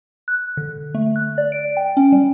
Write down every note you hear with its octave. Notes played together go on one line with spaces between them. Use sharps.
F#6
D3
A3
F#6
D5
D7
G5
C#4
G3